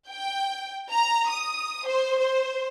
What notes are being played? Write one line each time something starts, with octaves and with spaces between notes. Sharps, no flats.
G5
A#5
D#6
C5
C5